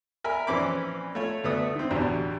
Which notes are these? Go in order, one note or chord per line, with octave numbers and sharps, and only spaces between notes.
A#4 E5 G#5 B5
A#1 E3 C4 C#4 B5 D6
A3 F4 C#5
D2 A3 B3 E5 D#6
D3 C4
A1 E2 B2 D3 G4